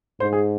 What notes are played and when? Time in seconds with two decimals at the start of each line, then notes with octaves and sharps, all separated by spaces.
0.20 G#2 C5
0.33 G#4